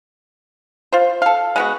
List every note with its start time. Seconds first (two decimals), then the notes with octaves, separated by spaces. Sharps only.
0.93 F4 C5
1.22 A4 F5
1.56 G#3 B3 F#4